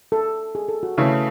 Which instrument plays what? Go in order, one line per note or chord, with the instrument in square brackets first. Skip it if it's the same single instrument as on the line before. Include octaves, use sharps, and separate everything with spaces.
[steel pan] A4
G#4
A4
F#4
[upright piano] C#3 E3 A3 C#4 E4